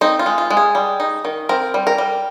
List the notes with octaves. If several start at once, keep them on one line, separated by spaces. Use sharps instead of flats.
C4 D#4
F4
G#3
F4
G#3
G#4
G3
D#4
D#3
C4 A#4
G3
A#4
G3